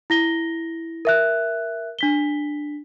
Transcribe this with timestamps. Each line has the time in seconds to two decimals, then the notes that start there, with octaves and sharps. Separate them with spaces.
0.10 E4 A#6 G7
1.05 A#4 E5 F#6
1.99 D4 B6 G7